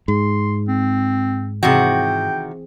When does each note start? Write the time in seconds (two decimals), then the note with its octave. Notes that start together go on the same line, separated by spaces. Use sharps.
0.08 G#2 G#4 C6
0.68 C4
1.63 C3 D#3 E3 C4 F#4 G#4 G5